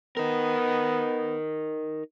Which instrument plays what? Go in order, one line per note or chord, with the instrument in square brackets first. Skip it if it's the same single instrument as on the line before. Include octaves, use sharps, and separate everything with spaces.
[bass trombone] B3 [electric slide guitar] D#4 A#4